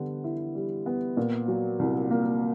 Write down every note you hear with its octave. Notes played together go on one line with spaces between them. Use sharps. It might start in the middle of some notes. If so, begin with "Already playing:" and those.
Already playing: D3 G3 B3
E4
G3
B3
A#2
F#3
C2
A#3